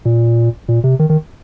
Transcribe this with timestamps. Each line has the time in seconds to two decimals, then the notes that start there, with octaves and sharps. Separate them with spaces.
0.05 A#2
0.68 A#2
0.84 C3
0.99 D#3
1.10 D#3